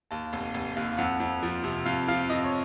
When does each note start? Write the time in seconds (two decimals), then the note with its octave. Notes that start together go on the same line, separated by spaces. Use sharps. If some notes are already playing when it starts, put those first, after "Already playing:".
0.11 D#2 A5
0.33 F1
0.54 F1
0.77 D#2
0.98 F2 F#5
1.20 F2
1.43 F3
1.64 C3
1.85 F2 F5
2.08 F3 F5
2.30 F2 D#5
2.44 C#5